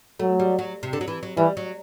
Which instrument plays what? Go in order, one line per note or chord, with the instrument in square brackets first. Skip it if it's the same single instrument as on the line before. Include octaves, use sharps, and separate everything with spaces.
[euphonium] F#3 [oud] A3
[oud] G3
F#3
C3
D3
F#3
E3
F#3
[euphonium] E3 [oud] G3
[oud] F#3